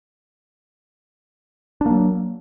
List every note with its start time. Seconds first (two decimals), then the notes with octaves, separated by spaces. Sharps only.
1.81 D4
1.86 A#3
1.91 F#3